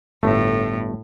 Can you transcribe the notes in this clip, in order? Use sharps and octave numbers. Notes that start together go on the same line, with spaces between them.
G1 A2 A3